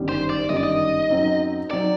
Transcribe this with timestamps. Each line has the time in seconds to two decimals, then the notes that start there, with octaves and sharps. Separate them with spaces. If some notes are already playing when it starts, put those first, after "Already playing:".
Already playing: G1 F#2 D#3 G3
0.09 C5
0.30 D5
0.49 G1 F#2 D#3 G3 D#5
0.57 D5
0.63 D#5
1.10 F#2 F#3 C4 D#4
1.71 F#3 C4 D#4 D5